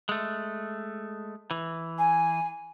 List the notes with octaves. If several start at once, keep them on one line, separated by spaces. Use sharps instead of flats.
G#3 A3
E3
G#5